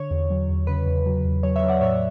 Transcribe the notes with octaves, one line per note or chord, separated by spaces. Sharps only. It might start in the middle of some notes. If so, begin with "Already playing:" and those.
Already playing: D3 C#5
E2
F#3
E2
C#3 B4
E2
F#3
E2
F#3 C#5
C#5 E5
F#3
D5 F#5
A2 C#5 E5